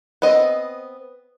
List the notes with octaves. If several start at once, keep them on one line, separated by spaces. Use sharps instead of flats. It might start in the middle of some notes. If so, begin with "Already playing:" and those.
B3 C4 D#5